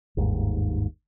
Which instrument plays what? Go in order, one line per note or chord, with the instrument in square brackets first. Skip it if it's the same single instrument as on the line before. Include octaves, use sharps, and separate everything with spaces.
[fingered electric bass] G1 D#2 G#2